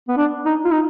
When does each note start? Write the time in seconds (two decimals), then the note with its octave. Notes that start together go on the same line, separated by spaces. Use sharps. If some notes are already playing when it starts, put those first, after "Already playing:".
0.08 B3
0.17 D4
0.45 D#4
0.64 F4
0.71 D#4